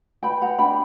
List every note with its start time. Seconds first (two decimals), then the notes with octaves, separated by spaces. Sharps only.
0.23 B4 G5 B5
0.42 F#5 A#5
0.59 D4 G5 B5